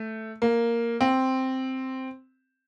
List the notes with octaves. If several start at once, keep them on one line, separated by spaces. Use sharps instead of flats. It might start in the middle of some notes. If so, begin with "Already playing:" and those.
Already playing: A3
A#3
C4